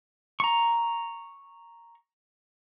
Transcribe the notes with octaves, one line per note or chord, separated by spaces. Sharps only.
A#5 C#6